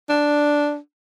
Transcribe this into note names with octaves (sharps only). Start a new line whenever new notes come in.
D4